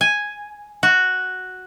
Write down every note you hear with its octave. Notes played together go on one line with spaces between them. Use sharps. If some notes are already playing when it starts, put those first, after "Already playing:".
G#5
F#4